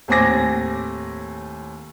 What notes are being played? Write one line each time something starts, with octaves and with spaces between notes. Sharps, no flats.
D#2 A2 C4 G#5 D6 A#6